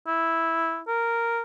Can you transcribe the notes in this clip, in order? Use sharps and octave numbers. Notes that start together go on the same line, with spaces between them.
E4
A#4